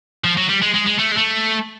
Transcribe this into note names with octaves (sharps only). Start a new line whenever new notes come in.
F3
F#3
G3
G#3
G#3
G#3
A3
G#3
A3